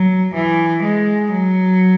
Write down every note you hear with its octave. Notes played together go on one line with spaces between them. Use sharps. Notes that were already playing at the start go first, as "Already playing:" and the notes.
Already playing: F#3
E3
G#3
F#3